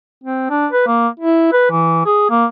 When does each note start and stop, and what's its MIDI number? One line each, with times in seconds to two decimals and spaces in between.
0.24 0.47 60
0.50 0.67 62
0.72 0.84 71
0.87 1.08 58
1.19 1.49 64
1.52 1.71 71
1.71 2.04 52
2.05 2.25 68
2.30 2.45 58